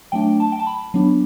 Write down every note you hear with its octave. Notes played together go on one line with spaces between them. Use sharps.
F#3 A3 D4 G5
A5
G5
A5
B5
F#3 B3 D4